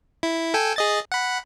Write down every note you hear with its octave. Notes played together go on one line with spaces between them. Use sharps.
E4
A4 G5 G#5
G#4 D#5 A6
F#5 B5